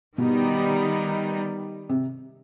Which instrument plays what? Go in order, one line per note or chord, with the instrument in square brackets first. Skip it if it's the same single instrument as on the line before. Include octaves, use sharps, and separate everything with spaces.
[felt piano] B2 [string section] D#3 G3 B3 D#4
[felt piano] C3